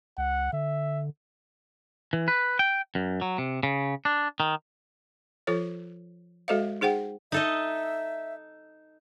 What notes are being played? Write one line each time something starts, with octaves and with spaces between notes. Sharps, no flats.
C#2 F#5
D3 E5
E3
B4
G5
F#2
F#3
C3
C#3
D4
D#3
F3 F4 A4 C5 C#5
G#3 F#4 A4 C5 D#5 F5
D#4 G#4 C5 F#5 G5
D#4 A4 D#5 E5